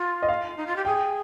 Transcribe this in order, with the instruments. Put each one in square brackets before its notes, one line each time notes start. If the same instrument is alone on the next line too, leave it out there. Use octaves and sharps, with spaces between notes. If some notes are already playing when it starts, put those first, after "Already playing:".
Already playing: [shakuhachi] F4
[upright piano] D#5
F5
[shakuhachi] D#4
F4
G4
[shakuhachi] G#4 [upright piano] G5